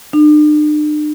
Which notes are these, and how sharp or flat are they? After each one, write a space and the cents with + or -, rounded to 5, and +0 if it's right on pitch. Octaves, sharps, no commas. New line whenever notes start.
D4 +45